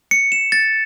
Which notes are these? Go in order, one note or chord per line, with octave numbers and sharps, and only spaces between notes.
C#7
E7
A6